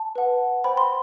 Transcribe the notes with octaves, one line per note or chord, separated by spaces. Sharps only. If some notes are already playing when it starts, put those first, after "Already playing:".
Already playing: A5
B4 F#5
C5 G5 B5
C6